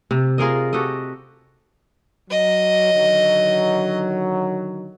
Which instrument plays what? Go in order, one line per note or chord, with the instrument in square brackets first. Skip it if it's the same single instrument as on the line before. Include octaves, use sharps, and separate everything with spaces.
[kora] C3
F4 G#4 A#4 D#5
F#4 G4 A4 D#5
[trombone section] F#3 [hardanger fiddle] D#5
[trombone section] D3 D#3 F#3